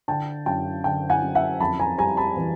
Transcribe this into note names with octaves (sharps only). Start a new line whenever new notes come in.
D3 G5 A5
F#2 G5 A5
D3 G5 A5
F#5 G#5
F#2
E5 F#5
F2 A5 B5
G#5 A#5
G3 G#5 A#5
A5 B5
E3